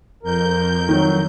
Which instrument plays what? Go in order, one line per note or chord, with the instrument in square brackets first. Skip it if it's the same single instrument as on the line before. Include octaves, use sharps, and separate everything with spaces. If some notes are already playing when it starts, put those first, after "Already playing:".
[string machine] F2 G6 [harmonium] A#4
[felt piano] D#3 [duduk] F#3